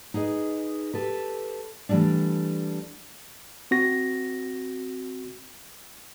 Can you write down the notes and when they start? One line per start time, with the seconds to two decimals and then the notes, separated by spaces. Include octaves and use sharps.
0.14 D#4 G#4 B4 D#5
0.94 G4 A4 B4
1.89 E3 F#3 G3 A3 D4
3.71 C4 F#4 A#6